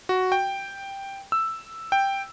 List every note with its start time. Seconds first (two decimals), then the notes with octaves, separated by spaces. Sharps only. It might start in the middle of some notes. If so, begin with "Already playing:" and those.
0.09 F#4
0.32 G5
1.32 E6
1.92 G5